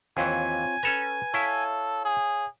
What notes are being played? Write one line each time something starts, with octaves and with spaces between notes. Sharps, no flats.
D#2 E3 C4 F4 C#5 G#5
C#4 A4 B4 A#5 G#6
E4 A4 C#5 F5
G#4